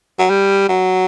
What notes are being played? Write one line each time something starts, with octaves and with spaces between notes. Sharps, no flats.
F#3
G3
F#3